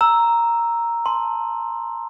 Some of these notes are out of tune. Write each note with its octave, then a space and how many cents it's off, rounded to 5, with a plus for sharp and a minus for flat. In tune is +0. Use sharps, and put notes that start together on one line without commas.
A#5 +0 E6 +0
A5 +0 C6 +0